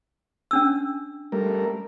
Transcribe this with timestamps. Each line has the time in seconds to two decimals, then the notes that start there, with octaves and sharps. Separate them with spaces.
0.51 C#4 D4 E6
1.32 G3 A3 A#4